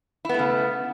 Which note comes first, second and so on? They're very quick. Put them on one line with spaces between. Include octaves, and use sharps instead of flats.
E4 B3 A3 C#3